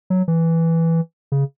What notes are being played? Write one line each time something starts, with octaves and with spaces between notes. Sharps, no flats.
F#3
E3
C#3